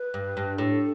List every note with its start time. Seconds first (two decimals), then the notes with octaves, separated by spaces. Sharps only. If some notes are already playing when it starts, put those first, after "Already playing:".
Already playing: B4
0.14 G2
0.37 G2
0.58 A2 A4